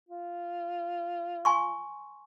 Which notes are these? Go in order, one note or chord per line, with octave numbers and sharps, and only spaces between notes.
F4
G#5 C6 C#6